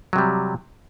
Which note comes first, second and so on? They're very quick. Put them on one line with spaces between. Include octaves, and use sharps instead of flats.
F#3 C3 G3